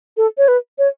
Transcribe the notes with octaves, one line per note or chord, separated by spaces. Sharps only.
A4
C#5
B4
C#5